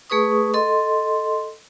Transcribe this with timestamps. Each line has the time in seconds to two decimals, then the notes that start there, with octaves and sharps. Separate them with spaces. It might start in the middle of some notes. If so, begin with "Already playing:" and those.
0.10 A3 G#4 B4 C#6 D#6
0.54 A4 D#5 C6